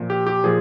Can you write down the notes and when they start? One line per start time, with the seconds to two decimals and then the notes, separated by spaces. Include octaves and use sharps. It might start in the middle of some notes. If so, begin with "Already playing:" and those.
Already playing: A#2 F3
0.10 G4
0.26 G4
0.44 A#2 F3 G#4